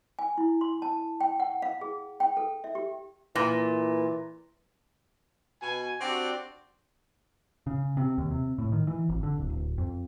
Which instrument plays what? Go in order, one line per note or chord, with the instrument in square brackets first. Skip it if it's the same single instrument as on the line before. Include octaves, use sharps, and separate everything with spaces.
[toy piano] G#5
E4
C6
A5
G5
F#5
F5
G#4
G5
A4
E5
G4
[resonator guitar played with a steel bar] A#2 [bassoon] E3
[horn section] B2 G#5
C4 D4 F#4 G4 D5
[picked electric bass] C#3
C3
D#2
C3
A2
D#3
E3
G#1
D3
D1
D1
F2